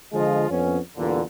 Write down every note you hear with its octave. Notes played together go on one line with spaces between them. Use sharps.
D3 F3 G#3 F4 D#5
F2 B3 C#4
E2 G2 A#2 D3